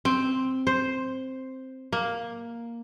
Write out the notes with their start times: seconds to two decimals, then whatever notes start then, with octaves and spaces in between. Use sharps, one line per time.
0.05 C4
0.67 C5
1.93 A#3